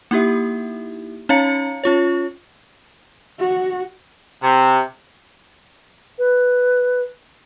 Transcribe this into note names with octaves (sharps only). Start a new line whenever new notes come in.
A#3 D#4 E4 G4 E5
C#4 D#4 C#5 F5 A#5 C#7
C#4 F4 C#5
F#4
C3
B4